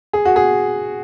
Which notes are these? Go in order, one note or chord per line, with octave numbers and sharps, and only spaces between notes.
G#4
F#4
G#4